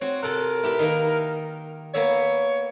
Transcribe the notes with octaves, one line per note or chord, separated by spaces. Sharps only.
C4 F#4 C#5
C3 A4 A#4 F#5
E4 G4 B4
D#3 A#3
A#3 B3 C#5 E5